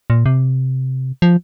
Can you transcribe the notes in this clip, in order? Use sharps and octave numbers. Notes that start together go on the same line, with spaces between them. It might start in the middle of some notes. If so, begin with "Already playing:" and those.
A#2
C3
F3